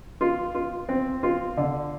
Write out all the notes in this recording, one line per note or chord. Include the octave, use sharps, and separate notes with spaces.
F4
F4
C4
F4
D3